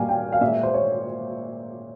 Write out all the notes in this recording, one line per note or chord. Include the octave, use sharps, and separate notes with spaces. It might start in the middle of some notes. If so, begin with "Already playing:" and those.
Already playing: A#2 G3 A#3 F5 G#5
G5
F5
A#2 G#3 E5
E5
C5
C#5